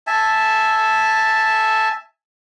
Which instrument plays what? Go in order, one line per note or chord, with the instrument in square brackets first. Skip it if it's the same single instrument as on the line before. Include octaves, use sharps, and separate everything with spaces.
[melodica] E5 G#5 A5